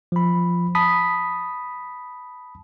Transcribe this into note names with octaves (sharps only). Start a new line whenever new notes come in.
F3 B5
A5 B5 D#6 B6